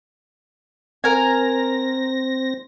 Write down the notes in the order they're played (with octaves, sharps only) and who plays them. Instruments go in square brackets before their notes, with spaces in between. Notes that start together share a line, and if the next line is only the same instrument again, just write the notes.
[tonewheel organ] C4 A#6 [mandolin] A#4 G#5